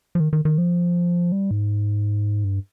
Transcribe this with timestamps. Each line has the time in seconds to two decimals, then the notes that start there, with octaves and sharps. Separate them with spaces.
0.15 F3
0.20 D#3
0.33 D#3
0.45 D#3
0.58 F3
1.32 G3
1.51 G#2
2.44 G2